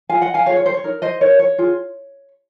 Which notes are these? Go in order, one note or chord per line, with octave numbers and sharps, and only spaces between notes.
F4 G#4 F5 G#5
D#5 F#5
F5 G#5
F4 G#4 C#5 F5
C#5
C5
C#5
D#4 A#4
C5 D#5
D#4 A#4 C#5
C#5
F4 G#4